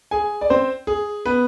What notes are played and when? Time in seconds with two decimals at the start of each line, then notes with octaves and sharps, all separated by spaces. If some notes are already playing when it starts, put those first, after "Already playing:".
0.11 G#4 G#5
0.41 D5
0.50 C4 C5
0.87 G#4
1.26 B3 B4